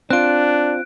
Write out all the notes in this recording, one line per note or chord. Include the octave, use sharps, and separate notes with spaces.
C4 D4 F4 F#6 D7